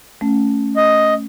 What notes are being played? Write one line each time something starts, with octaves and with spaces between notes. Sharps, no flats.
A3 C#4
D#5